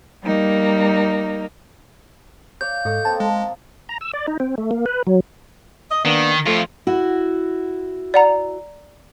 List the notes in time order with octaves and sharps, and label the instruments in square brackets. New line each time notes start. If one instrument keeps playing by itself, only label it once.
[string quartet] G3 A#3 D#4
[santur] C#5 D5 F5 [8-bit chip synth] G6
[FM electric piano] G#2 [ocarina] A4 [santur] D#5 C#6 D#6
[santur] A#3 C4 [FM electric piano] A5
[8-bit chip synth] G#3
[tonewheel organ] A#5
E6
D5
D#4
C4
A3
A#3
B4
F#3
[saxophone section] D#5
[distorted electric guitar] D#3 [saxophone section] A#3 B3 D4
[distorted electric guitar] F2 F4 [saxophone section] A3
[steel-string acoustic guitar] E4 F#4
[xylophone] D5 F#5 A#5